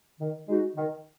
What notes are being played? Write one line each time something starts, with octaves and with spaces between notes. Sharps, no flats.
D#3
G#3 D#4 F#4
D#3